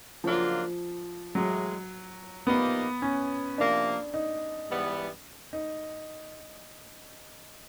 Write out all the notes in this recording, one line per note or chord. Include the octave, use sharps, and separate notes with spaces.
C#3 F3 F#3 A#3 D4 F4
A2 E3 F#3 G#3
A#2 F3 A#3 B3 D#4 G4
C#4
C3 F3 A#3 D4
D#4
G#2 E3 G3 B3
D#4